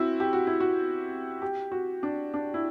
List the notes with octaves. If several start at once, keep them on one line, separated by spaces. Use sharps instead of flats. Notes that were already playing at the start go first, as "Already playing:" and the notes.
Already playing: C4 E4 F#4
G4
F#4
E4
F#4
G4
F#4
D4
D4
E4